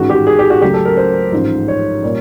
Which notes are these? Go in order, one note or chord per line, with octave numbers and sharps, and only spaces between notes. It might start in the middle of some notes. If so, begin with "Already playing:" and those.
Already playing: A1 G#2 D#3 G#3 F#4
G4
G#4
G4
F#4
C#2 C#3 F#3 A3 G4
A4
A#4
C5
A1 G#2 F3
C#5
A#2 G3